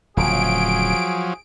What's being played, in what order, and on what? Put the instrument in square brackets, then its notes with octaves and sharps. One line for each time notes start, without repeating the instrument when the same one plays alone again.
[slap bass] D1 C#3 [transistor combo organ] F3 F#3 [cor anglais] G#4 [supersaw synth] D7